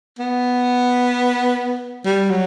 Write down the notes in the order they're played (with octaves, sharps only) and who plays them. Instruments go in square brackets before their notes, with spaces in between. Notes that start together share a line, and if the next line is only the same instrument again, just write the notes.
[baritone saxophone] B3
G3
F#3